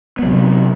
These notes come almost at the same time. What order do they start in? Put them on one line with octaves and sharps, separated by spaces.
B3 F#3 C3